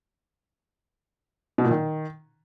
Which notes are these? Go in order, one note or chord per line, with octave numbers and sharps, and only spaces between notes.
B2
A#2
D#3